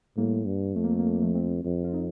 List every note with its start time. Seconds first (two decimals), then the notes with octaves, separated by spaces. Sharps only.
0.17 A2 G3 A#3
0.46 G2
0.75 F2 A3
0.84 A#3
0.91 A3
0.99 A#3
1.07 A3
1.14 A#3
1.22 F3 A3
1.34 A3 C4
1.64 F2
1.84 F4
1.93 C4 D#4